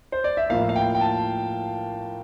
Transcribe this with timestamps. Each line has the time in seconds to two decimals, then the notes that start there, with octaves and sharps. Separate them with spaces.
0.12 C5
0.24 D5
0.37 E5
0.50 A2 F3 A#3 F5
0.69 F5
0.76 G5
0.95 G5
1.01 A5